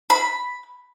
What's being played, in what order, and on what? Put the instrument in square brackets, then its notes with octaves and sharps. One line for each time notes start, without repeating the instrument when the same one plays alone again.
[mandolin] B5